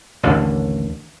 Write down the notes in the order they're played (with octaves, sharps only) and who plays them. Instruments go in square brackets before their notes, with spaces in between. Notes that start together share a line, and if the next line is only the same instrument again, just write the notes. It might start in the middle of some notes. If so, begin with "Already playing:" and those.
[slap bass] A1 D#2 D3 D4